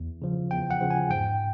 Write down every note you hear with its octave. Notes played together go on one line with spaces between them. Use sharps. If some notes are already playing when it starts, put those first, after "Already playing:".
Already playing: E2
C#3 F3
E2 G5
F#5
C#3 F3
G#5
G#2 G5